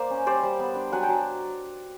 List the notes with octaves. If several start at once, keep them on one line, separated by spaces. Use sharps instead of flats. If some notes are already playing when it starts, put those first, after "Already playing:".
Already playing: A#3 C5 D5
C#4
G3 C5 D5
G3
B3
D4
F#3 F#5 G#5
G5 A5
F#3